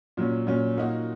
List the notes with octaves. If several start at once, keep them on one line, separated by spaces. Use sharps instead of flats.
A#2 F#3 C#4
A#2 F#3 C#4
A#2 A#3 D#4 F#4